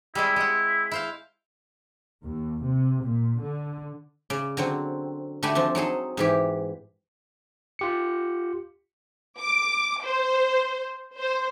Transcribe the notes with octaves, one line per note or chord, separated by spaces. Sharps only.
G3 G#3 C4 E4
G#3 F#5
E4 C5 F5
D#2
C3
A#2
D3
C#3 D5
D3 F#3 C4
D3 A3 F#4 G4 G#5 B5
F3 C4 D4
F#3 D#4 G#4 A4
G#2 E3 G4
F4 G4 C#7
D6
C5
C5